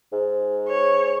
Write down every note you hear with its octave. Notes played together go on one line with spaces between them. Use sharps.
G#2
C#5